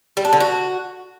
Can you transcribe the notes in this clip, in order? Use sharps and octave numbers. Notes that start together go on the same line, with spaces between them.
G3
D4
D3
F#4